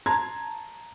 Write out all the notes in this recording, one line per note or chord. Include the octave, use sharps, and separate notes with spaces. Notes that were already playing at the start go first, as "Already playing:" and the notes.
A5 A#5 C6 G#6